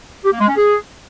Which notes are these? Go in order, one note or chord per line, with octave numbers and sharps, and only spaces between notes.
G4
A#3
G#3
C#4
G#4